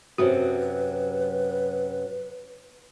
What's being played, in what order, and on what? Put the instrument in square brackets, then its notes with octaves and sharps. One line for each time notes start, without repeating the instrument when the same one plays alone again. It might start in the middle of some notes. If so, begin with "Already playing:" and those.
[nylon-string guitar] F#2 C3 F#3 [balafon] F#4 [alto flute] B4